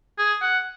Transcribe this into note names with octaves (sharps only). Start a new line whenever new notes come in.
G#4
F#5